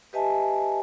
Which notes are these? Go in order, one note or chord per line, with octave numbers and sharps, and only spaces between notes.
G4 B4 D#5 E5 G#5 A5